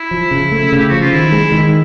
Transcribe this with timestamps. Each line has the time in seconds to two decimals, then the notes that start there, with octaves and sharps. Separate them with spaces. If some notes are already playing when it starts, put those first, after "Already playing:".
Already playing: E4
0.11 F3
0.31 C#3
0.52 A3
0.72 C#3 G4
0.89 F3 F#4
1.01 F4
1.12 D#3 E4
1.32 G#3
1.52 D#3